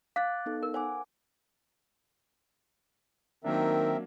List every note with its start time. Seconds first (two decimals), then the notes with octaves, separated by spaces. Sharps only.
0.16 F5 D6 F#6 A6
0.46 B3 D#4 A4
0.63 A#4
0.74 C5 F#5 G#5 D6
3.44 D#3 F#3 A#3 C4 D4 A#4 E5